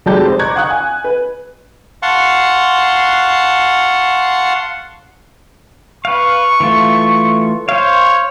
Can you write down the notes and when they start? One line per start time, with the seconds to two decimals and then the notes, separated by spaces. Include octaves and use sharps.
0.06 F1 F#3 G#3 G4 A5 G6
0.26 C5 D#5
0.39 A#5 C#6 D6 F#6 G#6
0.56 F5 F#5 C#6 D#6 F#6
0.70 G#5
1.04 B4
2.03 F5 F#5 A5 C6 C#6
6.05 B4 F5 C#6
6.60 E3 A3 F4
7.69 C5 C#5 F5